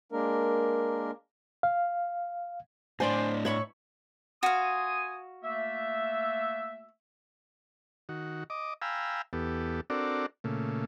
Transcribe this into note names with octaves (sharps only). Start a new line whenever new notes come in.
G#3 A#3 D4 A#4
F5
A2 D4 C5 D5 G#5 C6
C#5 E5 B5 C#6
F#4 F5 G#5 C6 D#6
A3 A#3 E5
D#3 F#4
D#5 D6
F5 G5 G#5 A#5 B5 E6
E2 B3 G4 A4
C4 D4 F#4 A4 A#4 D5
A#2 C#3 A3